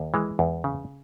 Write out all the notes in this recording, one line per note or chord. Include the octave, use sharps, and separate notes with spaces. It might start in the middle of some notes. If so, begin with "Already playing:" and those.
Already playing: D#2
E3 G#3
E2
C#3